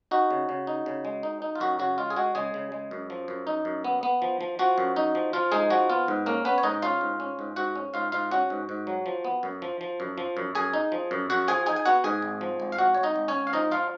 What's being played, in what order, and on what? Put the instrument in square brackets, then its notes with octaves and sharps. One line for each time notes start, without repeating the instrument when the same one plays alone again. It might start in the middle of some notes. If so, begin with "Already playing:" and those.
[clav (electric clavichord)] D#4 F#4
C#3
C#3
D#4
C#3
G#3
D#4
D#4
F4
F#2 F#4
C#3 F#4
G#3 F4
G#4
G#3 F#4
C#3 G#3 G#4
C#3
G#3
F#2
F3
F#2
D#4
F#2
B3
B3
F3
F3
F3 F#4
F#2
D#4
F3
F3 F4
G#3 D#4 G#4
F3 F#4
B3 F4
G#2
A#3 C#4 A#4
B3 C#4 B4
C#5
G#2 D#4 D#5
C#4 F4 F5
G#2
C#4
G#2
G#2 F#4 F#5
C#4
G#2 F4 F5
G#2 F4 F5
C#4 F#4 F#5
G#2
G#2
F#3
F3
B3
F#2
F3
F3
F#2
F3
F#2
F#2 G#4 G#5
D#4
F3
F#2
F#2 F#4 F#5
F3 G#4 G#5
D#4 G#4 G#5
G#5
B3 F#4 F#5
G#2 G#4 G#5
G#1
F3
G#1
F5
G#1 F#4 F#5
G#1 C#5
D#4 D#5
G#1
C#4 C#5
G#1
F5
F3 D#4 D#5
F3 F4 F5